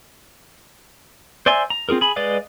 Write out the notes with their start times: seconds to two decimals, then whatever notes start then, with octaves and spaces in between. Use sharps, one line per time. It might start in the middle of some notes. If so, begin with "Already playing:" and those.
1.46 C5 D5 E5 G#5 C6
1.70 A#5
1.89 C4 F4 G#4 A#4
2.01 G#4 B5
2.16 G#3 B4 D5 D#5 F5